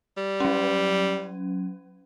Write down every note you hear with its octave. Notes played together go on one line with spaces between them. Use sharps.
G3
F#3 C#4